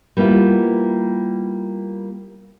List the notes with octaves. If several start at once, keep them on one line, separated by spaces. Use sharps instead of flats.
G3 A#3 B3 E4 F4